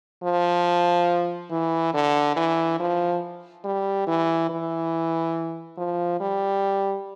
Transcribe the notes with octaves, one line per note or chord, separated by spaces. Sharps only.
F3
E3
D3
E3
F3
G3
E3
E3
F3
G3